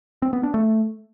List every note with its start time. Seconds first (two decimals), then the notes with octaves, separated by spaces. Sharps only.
0.22 C4
0.33 B3
0.43 D4
0.54 A3